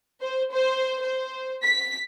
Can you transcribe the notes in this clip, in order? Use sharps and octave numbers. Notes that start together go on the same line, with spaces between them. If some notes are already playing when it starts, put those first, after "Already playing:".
C5
C5
C5
B6